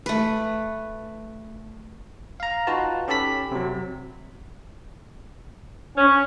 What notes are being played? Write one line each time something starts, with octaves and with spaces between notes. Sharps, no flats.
A3 B4
F5 A#5
D#4 F4 F#4 B4 A5
C#4 G4 A4 A5 B5 B6
C3 F#3
C#4